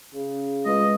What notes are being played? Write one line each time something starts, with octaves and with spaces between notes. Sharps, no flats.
C#3
G#3 F4 B4 D#5